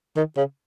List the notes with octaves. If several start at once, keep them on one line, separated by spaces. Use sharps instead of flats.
D#3
C#3